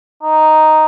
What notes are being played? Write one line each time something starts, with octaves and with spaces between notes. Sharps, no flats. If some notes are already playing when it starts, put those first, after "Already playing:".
D#4